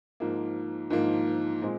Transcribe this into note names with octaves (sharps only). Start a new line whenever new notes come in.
G#2 F3 A#3
G#2 F3 A#3
A#2 G#3 C4